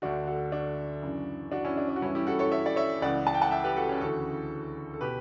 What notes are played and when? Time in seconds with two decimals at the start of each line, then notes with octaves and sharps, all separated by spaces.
0.02 D2 D3 D4 F#4
0.27 F#4 A4
0.52 D4 F#4
1.02 F#2 C#3 E3
1.52 D4 F#4
1.65 C#4 E4
1.77 D4
1.89 D4
1.96 F#4
2.02 G2 E3 C#4 E4
2.15 E4 G4
2.27 F#4 A4
2.39 A4 C#5
2.52 C#5 E5
2.66 D5
2.76 C#5 E5
3.02 C#2 C#3 E3 D5 F#5
3.27 A5
3.34 G5
3.42 F#5 A5
3.51 E5 G5
3.64 G4 B4
3.76 F#4 A4
3.89 C#4
4.01 D2 C#3 E3 F#4 A4
4.94 A4
5.01 B2 G4 B4